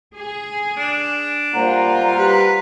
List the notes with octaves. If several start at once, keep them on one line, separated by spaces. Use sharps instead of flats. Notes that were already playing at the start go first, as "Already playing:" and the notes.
G#4
D4
A#2 G3 F4 C5 F#5 A#5
G4 B4